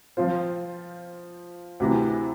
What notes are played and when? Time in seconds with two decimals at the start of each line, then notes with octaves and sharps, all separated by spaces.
0.17 F3 C4 F4 C5
1.80 D2 C3 E3